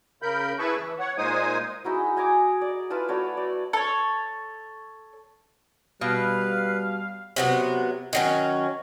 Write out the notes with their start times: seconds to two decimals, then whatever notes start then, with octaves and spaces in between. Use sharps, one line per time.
0.22 C#3 A#4 B5 G6
0.59 E4 G#4 B4 A5 B5 C#6
0.78 E3
0.99 C#5 F#5
1.18 A#2 G#3 D#4 C5 G#5 D#6
1.84 G#3 D#4 E4 F#4
2.16 D#5 G#5 A#5 D6
2.61 D5
2.90 E4 F4 B4 A5
3.08 A3 F#4 C#5 D5
3.37 D5
3.73 A4 C#5
6.01 B2 G3 B4 F5
7.36 C3 F#3 B3
8.13 D#3 F#3 C#4